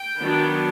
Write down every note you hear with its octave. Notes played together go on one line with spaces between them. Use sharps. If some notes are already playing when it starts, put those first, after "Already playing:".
Already playing: G5
D#3 F#3 B3 D4